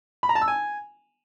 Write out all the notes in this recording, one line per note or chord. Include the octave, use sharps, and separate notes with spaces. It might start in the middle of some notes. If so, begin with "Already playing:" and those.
B5
A#5
A5
E6
G#5